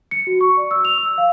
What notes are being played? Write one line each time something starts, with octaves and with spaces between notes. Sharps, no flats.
C#7
F#4
C#6
D5
E6
F7
E6
F5